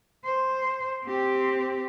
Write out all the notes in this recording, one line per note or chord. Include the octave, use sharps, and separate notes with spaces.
C5
C4 G4